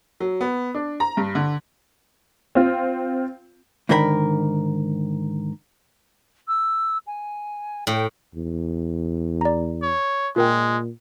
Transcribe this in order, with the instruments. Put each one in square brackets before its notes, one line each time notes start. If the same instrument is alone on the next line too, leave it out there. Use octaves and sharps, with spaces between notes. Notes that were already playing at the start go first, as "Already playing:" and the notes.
[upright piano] F#3
B3
D4
A#5
G2
D3
[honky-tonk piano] C4 F4
[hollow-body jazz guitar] G#2 D3 D#3 A#4 C5 B5
[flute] E6
G#5
[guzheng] A2 [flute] G5
[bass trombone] E2
[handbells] D5 A#5
[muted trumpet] C#5
[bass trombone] A#2 [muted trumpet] G#3 [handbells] F4 A#4 G5